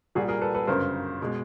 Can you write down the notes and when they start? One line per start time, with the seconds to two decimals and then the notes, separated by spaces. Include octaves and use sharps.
0.15 C2 A#2 G3 F#4 G#4
0.28 G#4 A#4
0.41 A4 B4
0.55 A4 B4
0.67 G1 F#2 C#3 A#4 C5
1.22 B2 G#3